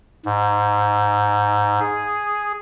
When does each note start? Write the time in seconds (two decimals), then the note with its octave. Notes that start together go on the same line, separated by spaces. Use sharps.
0.25 G#2
1.80 G#4